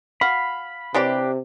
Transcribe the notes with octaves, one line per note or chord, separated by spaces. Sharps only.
F#4 F5 B5
C3 E3 D4 G4 C#5 D5